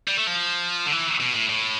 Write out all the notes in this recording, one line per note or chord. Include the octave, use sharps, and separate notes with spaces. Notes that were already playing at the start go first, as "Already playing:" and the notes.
G3
A3
F3
D3
E3
B2
A2
A2